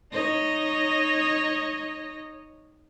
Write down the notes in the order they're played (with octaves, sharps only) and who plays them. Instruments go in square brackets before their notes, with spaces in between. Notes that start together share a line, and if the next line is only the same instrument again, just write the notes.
[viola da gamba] D#4 C#5 D#5